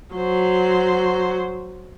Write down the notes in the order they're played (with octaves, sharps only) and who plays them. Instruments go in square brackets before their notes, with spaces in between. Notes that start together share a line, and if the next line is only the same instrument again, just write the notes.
[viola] F#3 C5